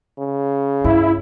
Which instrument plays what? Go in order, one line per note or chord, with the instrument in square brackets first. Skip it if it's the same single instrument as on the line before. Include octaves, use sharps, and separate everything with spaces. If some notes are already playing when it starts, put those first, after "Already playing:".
[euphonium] C#3
[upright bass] G2 [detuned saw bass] E4